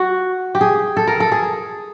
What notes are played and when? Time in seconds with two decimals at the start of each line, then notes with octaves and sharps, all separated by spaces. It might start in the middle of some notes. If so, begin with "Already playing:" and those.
Already playing: F#4
0.55 G4
0.61 G#4
0.97 A4
1.08 A#4
1.20 A4
1.32 G#4